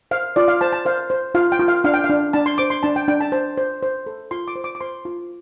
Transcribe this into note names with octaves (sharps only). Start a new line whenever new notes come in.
C5 F5
F4 D5
F5
C5 A5
A5
C5 F5
C5
F4 F5
G5
F4
F5
D4 F5
G5
F5
D4
D4 A5
C6
C5 D6
C6
D4 A5
G5
D4 G5
A5
C5 A5
C5
C5
A4
F4 C6
D6
C5
D6
D6
C5 C6
F4